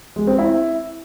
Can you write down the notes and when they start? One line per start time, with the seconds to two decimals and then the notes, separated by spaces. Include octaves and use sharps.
0.16 G#3
0.27 C4
0.39 E4